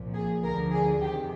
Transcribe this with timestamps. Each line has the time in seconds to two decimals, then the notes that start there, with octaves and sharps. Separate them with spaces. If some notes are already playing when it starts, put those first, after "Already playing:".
Already playing: C2 A#2 F3
0.14 G#4
0.43 D2 D3 F3 A#4
0.71 G#4
1.01 F2 C3 D#3 G4